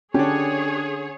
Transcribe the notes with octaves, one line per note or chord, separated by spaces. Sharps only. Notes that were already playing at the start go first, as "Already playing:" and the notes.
D3 C#4 D4 G4 G#4 C#5